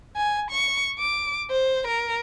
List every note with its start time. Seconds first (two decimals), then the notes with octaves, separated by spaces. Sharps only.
0.16 G#5
0.51 C#6
0.99 D6
1.51 C5
1.88 A#4